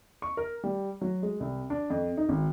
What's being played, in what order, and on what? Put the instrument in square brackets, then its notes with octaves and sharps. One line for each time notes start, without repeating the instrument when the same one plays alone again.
[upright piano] C#6
A#4
G3
F#3
G#3
C2
D4
F2
D#4
G#1